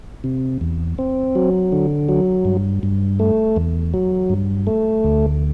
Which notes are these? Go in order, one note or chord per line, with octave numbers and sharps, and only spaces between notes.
C3
E2
C4
F#3
D3
F#3
G2
G2
A3
E2
F#3
G2
A3
D2